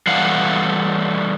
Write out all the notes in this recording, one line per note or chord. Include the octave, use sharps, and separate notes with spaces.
E3 G3 A3 F5 F#5